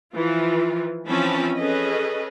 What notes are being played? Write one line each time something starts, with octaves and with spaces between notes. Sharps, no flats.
E3 F3 F4
E3 F3 C4 C#4 A5 B5
C#4 G#4 A4 B4 D#5